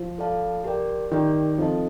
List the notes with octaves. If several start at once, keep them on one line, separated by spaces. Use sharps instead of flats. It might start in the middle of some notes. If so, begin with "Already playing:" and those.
Already playing: F3
F4 A4 D5 F5 A5
G4 A#4 D5 G5
D#3 G4 A#4 D5 G5
F3 C4 D#4 A4 D#5 A5